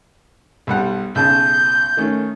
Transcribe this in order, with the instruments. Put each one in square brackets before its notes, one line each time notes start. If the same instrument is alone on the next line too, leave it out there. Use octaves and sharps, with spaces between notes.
[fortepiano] B1 G3 F#5
[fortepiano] B1 C#3 A5 [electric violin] G6
[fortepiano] D#3 A3 C#4